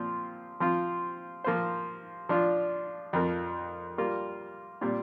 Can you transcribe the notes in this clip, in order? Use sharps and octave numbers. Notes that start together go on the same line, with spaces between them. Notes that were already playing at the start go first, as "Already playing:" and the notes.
Already playing: A#2 F3 C4 F4
F3 C4 F4
F3 A#3 F4 C5
F3 D4 F4
F2 F3 C4 A#4
G3 A#3 F4
A#2 G3 C4